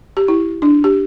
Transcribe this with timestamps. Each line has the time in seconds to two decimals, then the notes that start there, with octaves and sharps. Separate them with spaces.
0.17 G4
0.28 E4
0.62 D4
0.84 G4